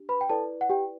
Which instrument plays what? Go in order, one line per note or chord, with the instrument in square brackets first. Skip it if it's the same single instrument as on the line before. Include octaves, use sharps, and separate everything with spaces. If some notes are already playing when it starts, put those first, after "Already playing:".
Already playing: [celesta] D4 G4
B4 B5
G5
E4 A4 B4 D5 A5
F#5
G4 G5